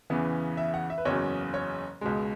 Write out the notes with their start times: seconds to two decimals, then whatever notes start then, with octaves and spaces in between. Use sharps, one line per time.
0.10 E2 C#3 E3 B3
0.57 E5
0.74 F#5
0.90 E5
0.98 B4
1.05 F#1 E2 C#3 F#3 C#5
1.54 C#5
2.01 C#2 B2 G#3